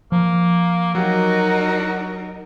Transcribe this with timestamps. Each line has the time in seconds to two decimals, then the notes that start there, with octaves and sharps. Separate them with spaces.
0.12 F3 A#3
0.95 F#3 D#4 F#4 G4 A#4